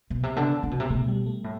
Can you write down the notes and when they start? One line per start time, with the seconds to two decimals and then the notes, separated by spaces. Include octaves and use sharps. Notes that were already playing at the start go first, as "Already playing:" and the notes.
0.10 B2
0.23 C3
0.36 D3 B3
0.63 C3
0.71 B2
0.80 C3
0.90 B2 A3
1.08 G3
1.26 A3
1.44 A2